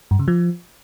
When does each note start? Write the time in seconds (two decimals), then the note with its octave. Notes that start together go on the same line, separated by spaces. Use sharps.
0.11 G2
0.19 C#3
0.28 F3